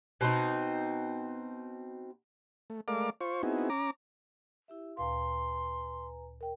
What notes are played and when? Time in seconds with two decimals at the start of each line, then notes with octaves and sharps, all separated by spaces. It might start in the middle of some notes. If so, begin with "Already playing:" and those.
0.21 B2 C4 D#4
2.70 A3
2.88 G#3 A3 A#4 D5 F5 D6
3.21 F4 C5 C#6
3.43 B3 C4 D#4 E4 F#4 G#4
3.70 C#4 A#5 D6
4.68 E4 G4 E5
4.97 D2 A#2 B4 F5 G#5 A#5 C6
6.41 A#4 G5